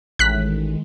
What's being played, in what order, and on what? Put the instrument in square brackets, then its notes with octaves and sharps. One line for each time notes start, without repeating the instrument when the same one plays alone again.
[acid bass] A1 [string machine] D#3 G#3 [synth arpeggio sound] F#6 B6